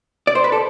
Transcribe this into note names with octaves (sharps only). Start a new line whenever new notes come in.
D5
C5
B4
A4